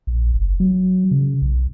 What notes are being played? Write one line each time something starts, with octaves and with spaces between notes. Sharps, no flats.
A#1
F#1
F#3
C#3
B1